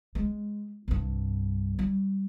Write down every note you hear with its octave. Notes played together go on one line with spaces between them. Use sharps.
G#3
C2 G2
G3